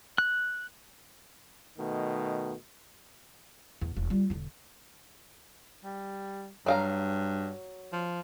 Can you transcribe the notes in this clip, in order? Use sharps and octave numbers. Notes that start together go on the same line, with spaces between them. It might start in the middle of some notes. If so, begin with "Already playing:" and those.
F#6
B2 D#3 A3
E2
E1
G3 F4
E1 D3
G3
G2 F#3 F5 A#5
F3